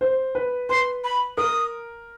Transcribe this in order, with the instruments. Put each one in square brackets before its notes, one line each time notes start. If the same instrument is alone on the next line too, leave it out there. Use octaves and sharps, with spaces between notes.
[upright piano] C5
B4
[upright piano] B4 [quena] C6
[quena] B5
[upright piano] A#4 [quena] D#6